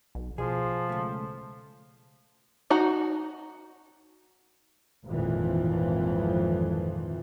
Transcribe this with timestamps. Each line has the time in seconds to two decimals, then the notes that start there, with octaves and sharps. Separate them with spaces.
0.15 B1
0.38 B2 F3 G#4
0.89 C#2 A3
2.70 D#4 F#4 F#5 A#5
5.07 G#1 F2 A#2 E3 F3